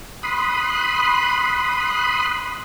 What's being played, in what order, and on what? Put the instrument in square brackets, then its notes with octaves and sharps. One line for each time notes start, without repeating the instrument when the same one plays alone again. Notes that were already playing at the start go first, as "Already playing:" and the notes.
[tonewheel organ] B5 C6 D#6 F#6